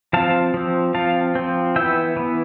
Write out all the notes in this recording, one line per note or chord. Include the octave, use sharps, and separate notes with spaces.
F3 C4 F5 A5
F3 C4
F3 C4 F5 A5
F3 C4
E3 B3 E5 G5
E3 B3